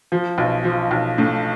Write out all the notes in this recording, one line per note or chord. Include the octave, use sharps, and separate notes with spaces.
F3
B1
F3
B1
A2